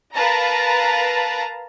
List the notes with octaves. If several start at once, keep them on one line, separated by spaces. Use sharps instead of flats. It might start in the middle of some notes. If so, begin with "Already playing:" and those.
A#4 B4 F5 A5 A#5